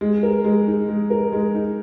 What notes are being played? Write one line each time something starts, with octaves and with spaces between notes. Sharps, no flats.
G#3
A#4
G#3
D#4
G#3
A#4
G#3
D#4